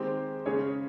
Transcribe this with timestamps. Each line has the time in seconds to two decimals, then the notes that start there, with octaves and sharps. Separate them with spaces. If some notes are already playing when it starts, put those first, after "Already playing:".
Already playing: D#3 G#3 C4 G4 C5
0.46 C#3 G#3 C#4 G#4 C#5